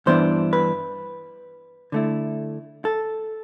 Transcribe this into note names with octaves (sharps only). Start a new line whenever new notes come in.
G2 E3 B3 D4 C5
B4
D3 A3 E4
A4